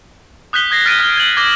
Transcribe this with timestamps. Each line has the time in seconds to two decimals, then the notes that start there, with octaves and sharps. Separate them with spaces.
0.53 D#6 F#6 G6 B6 G7
0.71 D#6 G#6 A#6 C7
0.86 F6 A6 B6 D7 D#7
0.99 F6 B6
1.17 G#6 F#7
1.36 D6 G#6 A#6